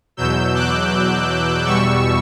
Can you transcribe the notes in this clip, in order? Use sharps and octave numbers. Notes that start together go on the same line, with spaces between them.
E2 B2 F#3 E6 G6
D6 F#6
E2 B2 G3 C#6 E6